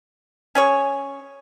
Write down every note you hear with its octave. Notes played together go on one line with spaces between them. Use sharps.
C#4 G#4 C#5